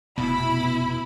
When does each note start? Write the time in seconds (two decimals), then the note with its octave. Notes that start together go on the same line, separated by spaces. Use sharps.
0.18 F1 B2 E4 B5